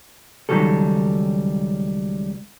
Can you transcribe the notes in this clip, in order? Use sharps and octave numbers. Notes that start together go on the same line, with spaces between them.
C#2 A2 D#3 F#3 G3 A4